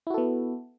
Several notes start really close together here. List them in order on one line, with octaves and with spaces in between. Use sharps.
E4 F#4 A4 B3